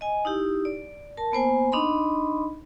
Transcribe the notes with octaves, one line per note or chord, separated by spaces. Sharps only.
D#5 G#5
D#4 E4 G4
D5
A#4 A5
A#3 B3 C5 G#5
D4 D#4 D#5 B5 C6